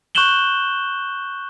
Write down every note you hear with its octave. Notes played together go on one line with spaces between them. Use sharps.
C#6 F#6 G6 E7 F#7 G7